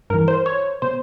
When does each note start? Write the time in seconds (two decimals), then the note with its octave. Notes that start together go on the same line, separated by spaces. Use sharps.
0.10 G2 E3 A#4
0.28 C5
0.46 C#5
0.82 B2 C5